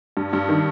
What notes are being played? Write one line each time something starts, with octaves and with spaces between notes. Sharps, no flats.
G2
G2
D#3